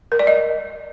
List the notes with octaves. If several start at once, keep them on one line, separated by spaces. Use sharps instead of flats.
A#4
D5
D#5